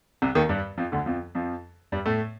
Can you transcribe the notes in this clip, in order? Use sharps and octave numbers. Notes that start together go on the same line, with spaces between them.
C2 C3
D#2 D#3
G2 G3
F2 F3
D2 D3
F2 F3
F2 F3
G2 G3
A2 A3